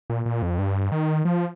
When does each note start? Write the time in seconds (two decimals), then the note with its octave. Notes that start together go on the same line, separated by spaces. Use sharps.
0.10 A#2
0.26 A#2
0.42 F2
0.59 G2
0.92 D#3
1.25 F3